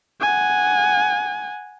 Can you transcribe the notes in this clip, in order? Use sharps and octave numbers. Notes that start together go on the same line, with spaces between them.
F#5 G#5